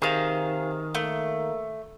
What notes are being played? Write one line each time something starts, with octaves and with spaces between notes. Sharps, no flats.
C3 D#3 G#4 F5
A3 A#3